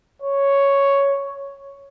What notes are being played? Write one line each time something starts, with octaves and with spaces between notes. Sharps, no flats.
C#5